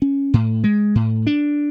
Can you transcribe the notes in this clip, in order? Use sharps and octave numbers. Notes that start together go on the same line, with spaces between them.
C#4
A2
G#3
A2
D4